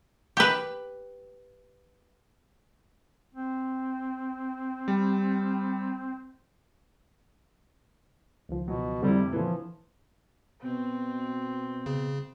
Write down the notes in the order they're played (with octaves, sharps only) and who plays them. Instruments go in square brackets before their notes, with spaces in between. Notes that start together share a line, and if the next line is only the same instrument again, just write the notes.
[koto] G4 B4
[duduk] C4
[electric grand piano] G3
[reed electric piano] C#2 D#3 F3
[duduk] B2 [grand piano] F#3
[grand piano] F1 E4 [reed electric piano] D3 C4 [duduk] G3
[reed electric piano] A#2 D3 [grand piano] E3 [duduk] F3
[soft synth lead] B2 [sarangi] C4
[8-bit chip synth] C#3